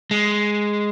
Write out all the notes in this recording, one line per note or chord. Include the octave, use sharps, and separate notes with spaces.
G#3